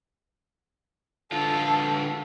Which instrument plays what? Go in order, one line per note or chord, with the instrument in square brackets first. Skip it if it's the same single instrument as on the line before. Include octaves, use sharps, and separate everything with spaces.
[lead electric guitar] D3 F4 [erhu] A4